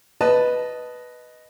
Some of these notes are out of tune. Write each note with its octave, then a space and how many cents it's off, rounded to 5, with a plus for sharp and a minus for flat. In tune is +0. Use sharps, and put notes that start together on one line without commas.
B4 +0 D#5 +0 A5 +0